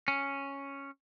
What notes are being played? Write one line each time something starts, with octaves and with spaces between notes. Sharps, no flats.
C#4